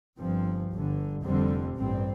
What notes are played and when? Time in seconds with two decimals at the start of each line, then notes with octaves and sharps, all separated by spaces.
0.19 G1 G2 F3 C4
0.72 G1 G2 D3
1.24 F1 F2 D3 G3 C4
1.76 A1 G2 G3 C4